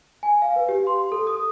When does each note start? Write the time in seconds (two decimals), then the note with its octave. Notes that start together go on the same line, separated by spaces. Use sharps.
0.23 G#5
0.42 F5
0.56 B4
0.69 G4
0.87 C6
1.12 A4
1.27 D#6